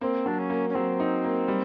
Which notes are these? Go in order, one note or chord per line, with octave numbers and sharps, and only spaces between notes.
A#3 C4
F#3 D4
C#4
A#3
C#4
F#3 C4
D#4
A#3
G3